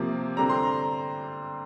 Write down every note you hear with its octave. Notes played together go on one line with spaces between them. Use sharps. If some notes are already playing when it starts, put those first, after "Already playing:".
Already playing: C3 F3 A#3 E5
D3 G3 C4 A#5
C6
A#5